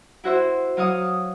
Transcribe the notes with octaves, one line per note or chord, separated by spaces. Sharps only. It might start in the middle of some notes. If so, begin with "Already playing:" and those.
E4 F#4 C5 E5
F#3 F5 C#6 D#6